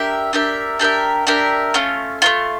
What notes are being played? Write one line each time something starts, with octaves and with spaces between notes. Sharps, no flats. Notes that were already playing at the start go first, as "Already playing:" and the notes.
Already playing: D4 G4 A#4 E5
D4 G4 A#4 E5
D4 G4 A#4 E5
D4 G4 A#4 E5
A3 C#4 F4
A3 C#4 F4